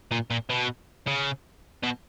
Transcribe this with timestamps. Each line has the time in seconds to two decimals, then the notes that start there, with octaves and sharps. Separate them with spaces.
0.11 A#2
0.30 A#2
0.50 B2
1.07 C#3
1.83 B2